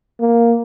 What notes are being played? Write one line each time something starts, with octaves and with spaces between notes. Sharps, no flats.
A#3